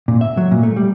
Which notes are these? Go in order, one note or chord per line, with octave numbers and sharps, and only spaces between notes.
A#2
E5
F#3
A#2
A3
G3